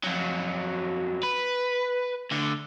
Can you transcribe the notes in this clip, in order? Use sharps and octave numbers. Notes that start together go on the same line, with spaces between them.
F2 F#3
B4
D2 D3